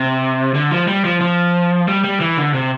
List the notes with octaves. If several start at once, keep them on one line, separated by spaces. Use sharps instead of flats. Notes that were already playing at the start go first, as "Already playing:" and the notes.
Already playing: C3
D3
F3
G3
F3
F3
G3
G3
E3
D3
C3